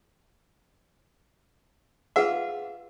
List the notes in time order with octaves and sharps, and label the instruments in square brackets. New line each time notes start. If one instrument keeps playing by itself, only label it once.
[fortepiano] F4 E5 [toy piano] G#4 B4 F#5